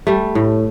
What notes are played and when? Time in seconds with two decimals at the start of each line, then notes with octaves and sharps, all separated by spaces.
0.07 G3 A3
0.35 A2